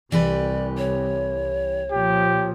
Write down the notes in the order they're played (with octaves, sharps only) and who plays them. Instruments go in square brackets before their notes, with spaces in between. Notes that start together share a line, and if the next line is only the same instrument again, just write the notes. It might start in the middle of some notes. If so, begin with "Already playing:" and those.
[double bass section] C2 [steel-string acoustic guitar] E3 G4 B4 [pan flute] D5
[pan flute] C#5
[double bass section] A#2 F3 [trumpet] G4